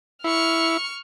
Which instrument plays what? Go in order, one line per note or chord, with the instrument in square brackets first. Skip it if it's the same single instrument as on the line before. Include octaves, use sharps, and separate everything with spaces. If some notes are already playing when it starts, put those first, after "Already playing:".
[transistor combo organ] E4 [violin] C#6 F6